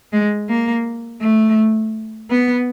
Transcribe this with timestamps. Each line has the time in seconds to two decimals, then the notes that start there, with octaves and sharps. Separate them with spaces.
0.13 G#3
0.49 A#3
1.21 A3
2.30 B3